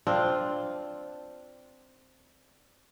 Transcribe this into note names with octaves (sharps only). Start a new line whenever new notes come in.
C4 D4 F4